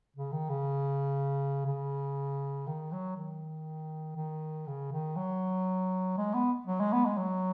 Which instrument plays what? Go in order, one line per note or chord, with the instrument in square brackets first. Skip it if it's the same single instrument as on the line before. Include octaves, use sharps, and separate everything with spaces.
[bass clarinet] C#3
D#3
C#3
C#3
D#3
F#3
D#3
D#3
C#3
D#3
F#3
G#3
B3
F#3
G#3
B3
G#3
F#3